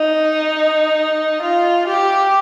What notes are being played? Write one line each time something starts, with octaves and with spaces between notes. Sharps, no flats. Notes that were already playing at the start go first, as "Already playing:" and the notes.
Already playing: D#4
F4
G4